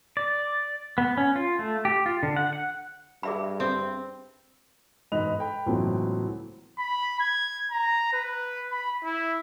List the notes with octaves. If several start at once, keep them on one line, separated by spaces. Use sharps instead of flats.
D5
B3
C#4
F4
A3
G4
F4
D3
F#5
F#5
G2 G#4 E5 B5
C4
E1 G#2 D#5 B5 F#6 F7
A4 G5 B5
C#2 A2 E3 F#3 B3 C4
B5
G#6
A#5
B4
B5
E4